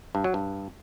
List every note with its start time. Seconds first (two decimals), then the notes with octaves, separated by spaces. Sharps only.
0.15 G2
0.24 F#3
0.34 G2